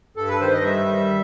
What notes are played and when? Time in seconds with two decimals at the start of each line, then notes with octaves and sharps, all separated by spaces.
0.16 G2 A4
0.28 B4
0.41 D#3 C5
0.52 D#5
0.63 G3 E5